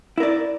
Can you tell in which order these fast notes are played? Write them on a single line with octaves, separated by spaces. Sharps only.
E4 A#4 D5